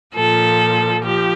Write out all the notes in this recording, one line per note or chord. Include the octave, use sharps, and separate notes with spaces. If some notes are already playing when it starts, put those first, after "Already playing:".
A#2 F3 A4
F3 G4